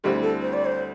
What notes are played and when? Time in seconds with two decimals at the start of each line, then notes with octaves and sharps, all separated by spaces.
0.04 D2 D3 G3 C4 E4 G4
0.22 A4
0.42 C5
0.53 D5
0.65 C5